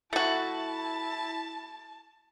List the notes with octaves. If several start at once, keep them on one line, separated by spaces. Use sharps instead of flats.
A3 E4 F#4 A5